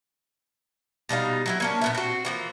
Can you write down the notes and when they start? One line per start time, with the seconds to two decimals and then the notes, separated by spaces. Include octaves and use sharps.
1.09 B2 G3 D#4 F5
1.46 F#3 C4 E4
1.60 A#3 C#4 D4
1.82 A#2 B3 E5
1.95 C4 F#4
2.25 E3 F3 A#3